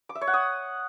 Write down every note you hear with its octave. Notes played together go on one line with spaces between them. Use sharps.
D6
E5
C#5
F#5
D#6